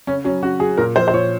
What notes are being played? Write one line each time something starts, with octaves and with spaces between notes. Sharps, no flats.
C#3 C#4
F#3 C#4
C#3 F#4
F#3 G#4
A#2 A#4
F3 C5
C5
A#2 C#5